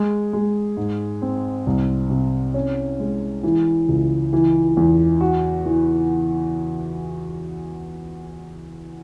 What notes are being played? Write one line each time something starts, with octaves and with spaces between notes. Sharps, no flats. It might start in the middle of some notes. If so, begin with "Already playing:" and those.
Already playing: G#3
G#3
G#2
C4
C2
C3
C#4
G#3
E3
C#2
E3
E2
F#4
E3